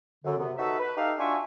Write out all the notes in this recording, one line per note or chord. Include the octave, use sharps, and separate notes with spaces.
F#2 D3
F#2 C3 B3
D#4 F#4 A4 B4 E5
B4
D#4 G4 A4 E5 F5
D4 F4 F#4 E5 G#5 C#6